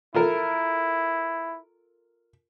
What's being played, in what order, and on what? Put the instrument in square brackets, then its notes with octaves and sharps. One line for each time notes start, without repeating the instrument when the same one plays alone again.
[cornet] E4 [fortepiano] F4 A4 A#4